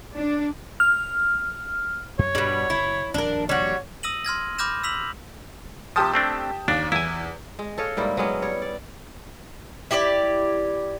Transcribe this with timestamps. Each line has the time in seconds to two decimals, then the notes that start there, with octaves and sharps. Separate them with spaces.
0.15 D4
0.80 F6
2.19 F#2 C#5
2.35 G2 B2 G3 D4
2.70 F#1 E4
3.14 D#1 A#1 F2 D4 A#4
3.49 G3 F#4 C#5
4.03 D#6 E6 A#6 D#7 F#7
4.25 C6 F6 G#6 A#6
4.58 B5 D6 F6 G6 A#6 E7
4.84 E6 B6 F7 F#7
5.96 C3 F3 G4 A5 D#6
6.14 A3 C4 D4
6.68 D#2 D4
6.92 E2 E4 G#5
7.59 G#3
7.78 A4 C#5 D#5 F5
7.97 G#2 G3 A#3 E4
8.17 F#3 G#3 B3 C#4
8.42 G3 C#5
8.62 D5
9.91 E4 G4 C#5 D5